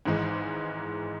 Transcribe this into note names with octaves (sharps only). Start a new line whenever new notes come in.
G#1 G#2 E3 G#3 D#4